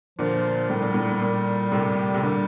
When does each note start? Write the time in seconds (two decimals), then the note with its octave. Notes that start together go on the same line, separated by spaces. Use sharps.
0.19 A#2 D3 F3
0.70 A2 G3
0.82 A#2
0.94 A2
1.21 A#2
1.72 A2 C3
2.14 C3
2.23 A#2 D3 G3